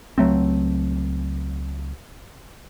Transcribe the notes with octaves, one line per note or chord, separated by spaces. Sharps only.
C#2 F#3 A3 C4